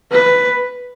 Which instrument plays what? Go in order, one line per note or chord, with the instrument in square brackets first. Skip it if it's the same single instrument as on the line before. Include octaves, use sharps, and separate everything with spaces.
[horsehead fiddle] B4